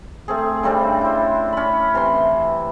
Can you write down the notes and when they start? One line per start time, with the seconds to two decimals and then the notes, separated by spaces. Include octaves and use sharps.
0.28 A3 C4 G#4
0.63 C#3 G3 C4 D4
1.01 E4 C5
1.53 C#4 B5
1.94 C3 E3 C5 C6